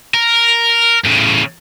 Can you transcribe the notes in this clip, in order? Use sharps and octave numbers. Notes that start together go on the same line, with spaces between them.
A#4
A2 C#3